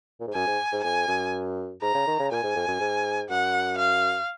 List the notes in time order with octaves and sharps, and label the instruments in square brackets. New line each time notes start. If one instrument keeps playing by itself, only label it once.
[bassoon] A#2
G#2
[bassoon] F#2 [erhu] G#5
[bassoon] G#2
G#2
[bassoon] F2 [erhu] G#5
[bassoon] F#2
[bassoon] G#2 [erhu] A#5
[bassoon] C#3
D#3
C#3
[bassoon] A#2 [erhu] G#5
[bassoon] G#2
F2
F#2
G#2
[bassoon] F#2 [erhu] F#5
[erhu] F5